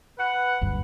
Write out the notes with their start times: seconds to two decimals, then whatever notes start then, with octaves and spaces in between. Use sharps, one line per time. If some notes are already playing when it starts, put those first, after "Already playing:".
0.18 B4 F#5
0.61 F#1 D2 G2